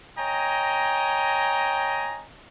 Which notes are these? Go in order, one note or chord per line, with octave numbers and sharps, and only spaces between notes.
C#5 D#5 G5 G#5 A#5